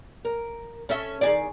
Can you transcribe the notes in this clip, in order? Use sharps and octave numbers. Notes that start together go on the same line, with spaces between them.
A#4
C#4 A4 E5
D#3 G#4 D5